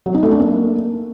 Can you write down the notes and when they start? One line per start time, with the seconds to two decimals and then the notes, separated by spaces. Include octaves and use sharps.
0.06 F#3
0.14 D#4
0.23 A3
0.31 D4
0.40 A#3